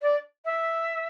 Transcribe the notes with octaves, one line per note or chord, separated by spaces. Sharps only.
D5
E5